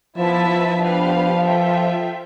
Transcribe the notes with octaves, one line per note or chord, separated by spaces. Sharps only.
F3 B3 E4 B4 E5 A5
F3
B3 D4 G4 B4 F5
F4 A4 E5 G5